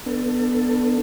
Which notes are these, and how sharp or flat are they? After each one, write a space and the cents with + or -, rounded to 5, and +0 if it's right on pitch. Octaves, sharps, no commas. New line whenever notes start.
B3 +0 D4 +0 A4 +20